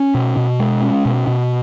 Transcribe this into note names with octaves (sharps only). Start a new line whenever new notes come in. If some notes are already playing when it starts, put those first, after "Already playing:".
Already playing: C#4
B2
B2
G#3
C#4
B2
B2